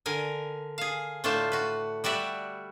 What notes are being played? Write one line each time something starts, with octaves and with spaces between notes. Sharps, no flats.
D3 A#4 G#5
G#4 F5
A2 A3 D4 F4 C5 A5
F#4 B4
G3 F#4 D5 E5 F#5